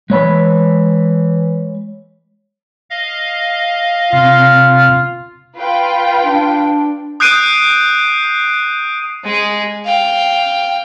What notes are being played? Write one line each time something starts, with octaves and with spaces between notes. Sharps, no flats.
E3 G#3 C#5 B5
D#5 F5
C3 F4
F4 B4 G5
D4
D#6 F#6 G6 C7 D7 D#7
G#3 G#4
F5 G5